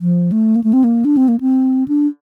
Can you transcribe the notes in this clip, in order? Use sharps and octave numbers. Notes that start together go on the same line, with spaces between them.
F3
A3
A#3
A3
C4
A#3
D4
C4
A#3
C4
D4